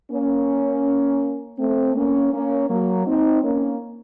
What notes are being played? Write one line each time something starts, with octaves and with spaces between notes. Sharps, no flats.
A#3 C#4
A3 C4
A#3 C#4
A#3 C#4
F#3 A#3
C4 D#4
A#3 C#4